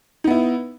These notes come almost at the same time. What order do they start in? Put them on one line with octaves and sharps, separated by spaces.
D#4 B3 E4